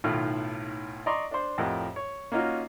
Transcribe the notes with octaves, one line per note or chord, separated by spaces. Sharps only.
B1 A2 D#3 A3 F4
D5 D#5 A#5 C6 C#6
D4 C5
F2 A2 G4 A#4 D#5 F#5
C#5
A#3 C#4 D#4 F4 F#4